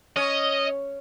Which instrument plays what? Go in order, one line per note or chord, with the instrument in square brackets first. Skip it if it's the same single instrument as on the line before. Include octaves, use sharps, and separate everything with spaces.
[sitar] C#4 [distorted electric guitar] D#5